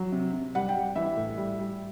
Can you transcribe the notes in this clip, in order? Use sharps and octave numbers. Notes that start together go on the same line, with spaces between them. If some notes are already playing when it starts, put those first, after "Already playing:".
Already playing: F#3
C3
C3
G3 F#5
G5
G3
E3 E5
A2
G3
G3